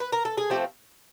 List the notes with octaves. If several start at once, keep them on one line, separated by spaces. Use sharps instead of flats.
B4
A#4
A4
G#4
F3 A3 C4 G4